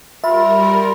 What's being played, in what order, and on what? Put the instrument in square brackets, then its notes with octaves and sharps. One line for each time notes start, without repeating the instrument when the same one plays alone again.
[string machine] G3 A#4 [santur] F4 [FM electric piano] E5 [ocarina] B5